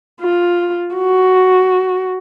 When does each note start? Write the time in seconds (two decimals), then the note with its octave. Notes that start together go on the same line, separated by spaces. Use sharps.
0.21 F4
0.96 F#4